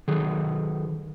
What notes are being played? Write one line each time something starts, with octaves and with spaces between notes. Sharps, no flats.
D#3 F#3 G#4 A4